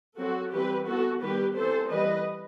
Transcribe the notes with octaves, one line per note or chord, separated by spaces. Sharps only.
F#3 C4 F#4 A4
E3 G3 C4 G4 B4
E3 B3 F#4 A4
D#3 G3 B3 G4 B4
E3 A3 C4 A4 C5
E3 G3 C4 B4 D#5